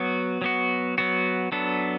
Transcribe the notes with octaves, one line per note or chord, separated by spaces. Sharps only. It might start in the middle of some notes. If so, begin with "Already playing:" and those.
Already playing: F#3 B3 F#4
F#3 B3 F#4
F#3 B3 F#4
F#3 B3 D4 A4